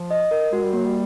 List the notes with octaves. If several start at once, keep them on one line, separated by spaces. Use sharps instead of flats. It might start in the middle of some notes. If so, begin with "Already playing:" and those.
Already playing: F3
D#5
A#4
G#3 F#4
G3
F#3 A#3
G3